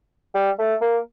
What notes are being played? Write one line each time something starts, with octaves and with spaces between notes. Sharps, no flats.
G3
A3
A#3